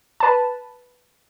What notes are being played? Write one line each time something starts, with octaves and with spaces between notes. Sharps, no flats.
B4 A5